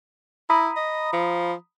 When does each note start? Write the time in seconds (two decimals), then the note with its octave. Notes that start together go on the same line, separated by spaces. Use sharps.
0.50 E4 A#5 B5 D#6
0.76 D#5
1.13 F3